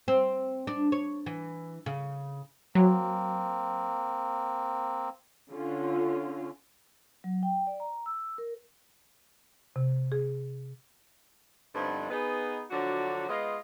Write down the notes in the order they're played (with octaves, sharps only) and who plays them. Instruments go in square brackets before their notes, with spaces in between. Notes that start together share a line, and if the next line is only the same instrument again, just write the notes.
[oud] C4
D4
C#5
E3
C#3
[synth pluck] F#3 [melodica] A#3 C4
[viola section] D3 C#4 F4
[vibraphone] F#3
G5
D5
A#5
E6
A#4
[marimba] C3
G#4
[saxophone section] G2 D3 F3 B3 C4 D#4
B3 D#4 G#4
D3 F3 F#3 D4 F#4
G#3 B3 F4 D#5